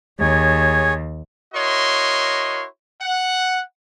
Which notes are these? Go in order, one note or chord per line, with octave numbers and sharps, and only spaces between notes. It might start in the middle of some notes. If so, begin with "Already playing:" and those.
D#2 G#4 C#5
E4 F#4 A#4 C#5 D#5 C6
F#5